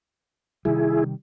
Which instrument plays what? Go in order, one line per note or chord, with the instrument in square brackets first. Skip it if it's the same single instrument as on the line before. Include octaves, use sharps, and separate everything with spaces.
[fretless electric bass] C3 D#3 G3 [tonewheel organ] E4 G#4